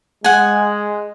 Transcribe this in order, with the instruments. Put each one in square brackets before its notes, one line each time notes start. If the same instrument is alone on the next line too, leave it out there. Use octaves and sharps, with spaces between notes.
[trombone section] G#3 [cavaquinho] F#5 G#5